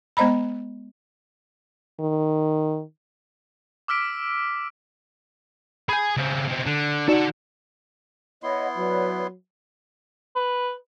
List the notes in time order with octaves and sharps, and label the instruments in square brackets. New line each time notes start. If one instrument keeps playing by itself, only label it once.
[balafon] G#3 B3 C5 D#5 A#5 B5
[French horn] D#3
[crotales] D6 E6 F6 B6 D7
[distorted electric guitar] G#4 G#5 [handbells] B5 G6
[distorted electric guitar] C#3 C4
B2 C4
D3
[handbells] D#4 F#4 D5 [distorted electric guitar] A4 F#5
[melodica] B3 E4 C6 [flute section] C#5 D#5 F#5
[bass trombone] F#3 [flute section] B4 C#5 D5
[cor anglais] B4